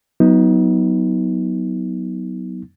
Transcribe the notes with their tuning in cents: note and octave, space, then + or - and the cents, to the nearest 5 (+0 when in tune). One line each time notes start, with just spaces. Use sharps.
F#3 +0 B3 +0 D#4 +35